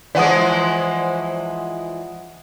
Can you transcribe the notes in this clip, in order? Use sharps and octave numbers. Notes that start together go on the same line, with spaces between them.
E3 F3 G#3 D5 F#5 D#6